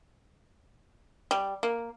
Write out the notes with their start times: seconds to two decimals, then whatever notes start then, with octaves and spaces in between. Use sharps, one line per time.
1.31 G3
1.63 A#3